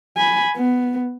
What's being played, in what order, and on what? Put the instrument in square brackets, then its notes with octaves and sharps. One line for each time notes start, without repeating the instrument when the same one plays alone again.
[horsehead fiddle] G#5 B5
B3